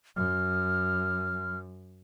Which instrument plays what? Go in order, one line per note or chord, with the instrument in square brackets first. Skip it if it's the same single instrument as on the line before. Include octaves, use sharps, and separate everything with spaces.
[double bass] F#2 [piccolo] F6